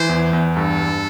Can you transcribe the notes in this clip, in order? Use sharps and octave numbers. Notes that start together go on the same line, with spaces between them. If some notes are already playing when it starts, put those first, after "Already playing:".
Already playing: E3 C5
E2
E2
G2 A4
G2